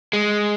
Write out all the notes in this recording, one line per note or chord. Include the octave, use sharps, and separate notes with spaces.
G#3